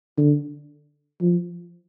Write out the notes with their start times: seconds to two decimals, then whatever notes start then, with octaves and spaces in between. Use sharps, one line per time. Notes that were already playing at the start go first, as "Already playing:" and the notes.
0.18 D3
1.21 F3